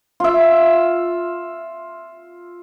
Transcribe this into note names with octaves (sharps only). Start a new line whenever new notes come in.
F4 E5